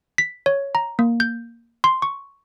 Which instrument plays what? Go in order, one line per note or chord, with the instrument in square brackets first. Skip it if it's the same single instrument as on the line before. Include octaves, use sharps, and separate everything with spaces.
[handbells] B6
C#5
A#5
A#3
G6
C6
C#6